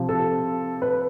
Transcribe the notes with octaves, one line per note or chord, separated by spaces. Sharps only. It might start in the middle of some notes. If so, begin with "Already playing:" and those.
Already playing: C3 F3
A4
B4